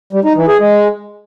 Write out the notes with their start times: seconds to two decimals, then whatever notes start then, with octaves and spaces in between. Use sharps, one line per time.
0.13 G3
0.25 D#4
0.36 E3
0.48 G#4
0.60 G#3